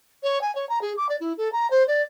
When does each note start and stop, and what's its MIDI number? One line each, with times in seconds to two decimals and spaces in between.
0.23 0.39 73
0.41 0.54 80
0.55 0.68 73
0.69 0.79 82
0.81 0.93 68
0.97 1.08 86
1.09 1.16 74
1.20 1.33 64
1.37 1.51 69
1.52 1.69 82
1.70 1.86 72
1.88 2.02 74